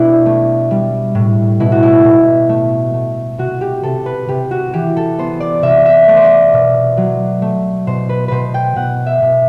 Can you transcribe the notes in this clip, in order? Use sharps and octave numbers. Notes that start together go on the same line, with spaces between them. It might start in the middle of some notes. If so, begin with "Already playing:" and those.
Already playing: B2 D4 E4
A3
G3
A2
B2 E4
F#4
E4
B2
A3
A3
C3 F#4
G4
C3 A4
B4
C3 G4
F#4
E3 G4
A4
B3 C5
D5
C3 E5
E5
A3 D5
C5
D5
B2
F#3
A3
B2 C5
B4
B2 B4 C5
G5
B2 F#5
E5
B2